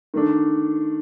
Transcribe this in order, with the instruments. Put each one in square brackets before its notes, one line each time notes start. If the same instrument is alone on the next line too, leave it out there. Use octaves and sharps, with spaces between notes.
[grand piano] D#3 A3 D4